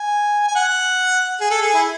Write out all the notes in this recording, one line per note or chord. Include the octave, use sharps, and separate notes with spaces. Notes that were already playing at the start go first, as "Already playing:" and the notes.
Already playing: G#5
G#5
F#5
G#4
A4
G#4
E4